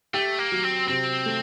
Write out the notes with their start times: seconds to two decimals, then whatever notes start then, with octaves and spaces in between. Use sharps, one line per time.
0.14 A3 G4
0.39 A#3
0.52 F#3
0.64 C4
0.88 C3 C4
1.26 A3